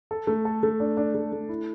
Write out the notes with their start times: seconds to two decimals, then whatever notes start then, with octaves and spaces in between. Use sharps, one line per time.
0.11 A4
0.27 A3
0.45 A4
0.63 A3
0.80 D4
0.97 D4
1.15 A3
1.32 A3
1.49 E4